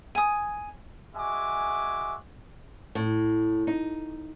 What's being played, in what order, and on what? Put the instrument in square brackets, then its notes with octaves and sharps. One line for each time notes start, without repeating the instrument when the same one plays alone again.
[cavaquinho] G#5 D#6
[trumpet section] G#3 F#4 E5 G#5 D6
[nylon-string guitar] A2
D#4